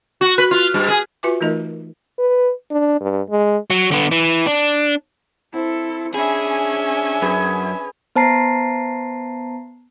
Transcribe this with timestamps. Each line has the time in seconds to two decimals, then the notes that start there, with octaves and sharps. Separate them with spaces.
0.21 F#4
0.38 B4
0.51 F4
0.74 G2
0.88 G#4
1.23 F4 F#4 B4 E5 G#5 D6
1.41 E3 A3 D#4 F4 A#4 D#5
2.19 B4
2.71 D4
3.01 G2
3.30 G#3
3.70 F#3
3.92 D3 B3
4.12 E3
4.46 D4
5.54 C4 E4 A4
6.14 C#4 D4 G#4 E5 G#5 B5
7.22 F#2 G#4 B4
8.15 B3 C5 A5 A#5 C7